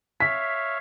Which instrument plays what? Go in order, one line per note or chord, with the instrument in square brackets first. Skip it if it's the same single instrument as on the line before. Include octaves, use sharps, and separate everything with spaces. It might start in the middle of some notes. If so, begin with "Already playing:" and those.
[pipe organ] C#5 E5 F5 [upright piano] B6